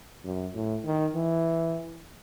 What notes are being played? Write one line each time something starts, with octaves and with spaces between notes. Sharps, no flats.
F#2
A2
D#3
E3